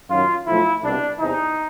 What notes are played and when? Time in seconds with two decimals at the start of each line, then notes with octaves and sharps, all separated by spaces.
0.09 F#2 D#3 F#3 F4
0.46 B1 A2 F3 A3 E4
0.84 C2 B2 G3 C4 D4
1.20 E2 C3 E3 D#4